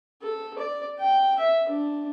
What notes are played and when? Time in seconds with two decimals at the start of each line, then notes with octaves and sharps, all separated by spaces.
0.22 A4
0.58 D5
0.99 G5
1.39 E5
1.69 D4